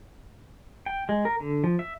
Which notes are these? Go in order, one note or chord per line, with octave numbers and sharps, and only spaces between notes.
G5
G#3
A#4
D3
F3
E5